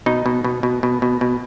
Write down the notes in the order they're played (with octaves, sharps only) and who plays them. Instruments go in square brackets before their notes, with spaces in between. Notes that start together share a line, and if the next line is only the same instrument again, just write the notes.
[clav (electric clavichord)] B2 D#4
B2
B2
B2
B2
B2
B2